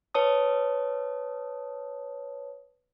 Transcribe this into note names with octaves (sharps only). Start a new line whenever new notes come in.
B4 C#5 A5 D#6